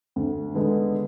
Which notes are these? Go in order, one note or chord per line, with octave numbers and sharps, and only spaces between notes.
D2
D3 G#3 B3